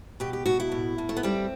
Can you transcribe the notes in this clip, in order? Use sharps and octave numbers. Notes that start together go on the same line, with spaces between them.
B2 G4
G4
B2 F#4
E4
A2
A2
A3
B3
G3 C4